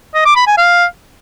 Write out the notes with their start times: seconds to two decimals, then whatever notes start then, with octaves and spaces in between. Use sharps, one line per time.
0.15 D#5
0.26 D6
0.36 B5
0.47 G#5
0.58 F5